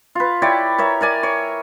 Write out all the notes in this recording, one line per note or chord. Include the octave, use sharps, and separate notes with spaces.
F4 B4
E4 G4 C#5 D5
A#4 C#5 E5
A#4 D5 G#5
C#5